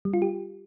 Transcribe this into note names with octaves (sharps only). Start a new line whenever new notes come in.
G3
F4
G4